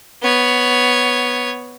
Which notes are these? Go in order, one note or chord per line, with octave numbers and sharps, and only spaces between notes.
B3 C#5